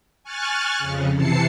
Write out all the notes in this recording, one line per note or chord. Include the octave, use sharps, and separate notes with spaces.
G#5 C#6 F6 F#6 A6
F2 C#3
C3 E3 A5 C7 C#7